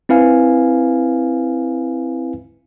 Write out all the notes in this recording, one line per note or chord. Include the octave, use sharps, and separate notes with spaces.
C4 E4 B4 F5 G#5